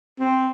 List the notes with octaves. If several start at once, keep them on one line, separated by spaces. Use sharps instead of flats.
C4